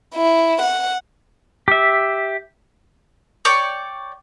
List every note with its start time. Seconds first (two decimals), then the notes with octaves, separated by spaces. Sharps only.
0.15 E4
0.62 F#5
1.68 G4 E5
3.45 C#5 D5 G5 C#6